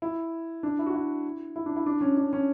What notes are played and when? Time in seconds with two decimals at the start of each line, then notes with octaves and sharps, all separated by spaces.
0.02 E4
0.63 D4
0.79 E4
0.86 F#4
0.94 E4
1.56 E4
1.66 D4
1.76 E4
1.86 D4
2.01 C#4
2.17 D4
2.33 C#4